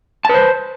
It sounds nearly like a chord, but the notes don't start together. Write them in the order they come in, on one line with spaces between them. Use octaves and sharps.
A5 B4 C5